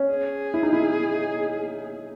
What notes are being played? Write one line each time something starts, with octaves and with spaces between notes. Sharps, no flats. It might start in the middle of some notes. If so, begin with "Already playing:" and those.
Already playing: C#4
G#4
E4
D#4
E4